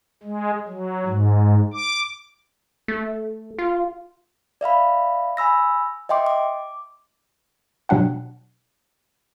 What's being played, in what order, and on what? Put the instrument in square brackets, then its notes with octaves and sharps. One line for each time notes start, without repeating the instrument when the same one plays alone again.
[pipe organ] G#3
F#3
G#2
D6
[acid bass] A3
F4
[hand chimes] D5 E5 F5 B5
G#5 B5 E6 A#6
D#5 E5 G5 C6 D6
D6
[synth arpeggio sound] B2 F#3 D4 F#5 G5